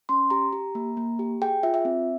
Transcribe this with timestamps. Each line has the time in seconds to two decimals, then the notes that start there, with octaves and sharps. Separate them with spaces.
0.09 C#4 C6
0.30 G4 A#5
0.53 G4
0.75 A#3
0.97 A#3
1.19 G4
1.42 G#4 G5
1.63 F4 E5
1.74 E5
1.85 C4